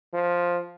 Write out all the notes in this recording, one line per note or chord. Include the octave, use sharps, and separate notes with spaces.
F3